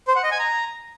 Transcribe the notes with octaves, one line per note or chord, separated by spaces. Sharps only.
C5
F#5
D#5
G#5
A#5